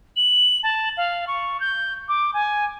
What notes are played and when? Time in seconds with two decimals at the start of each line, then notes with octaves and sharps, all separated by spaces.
0.16 F#7
0.63 A5
0.97 F5
1.27 C#6
1.60 G6
2.08 D6
2.34 G#5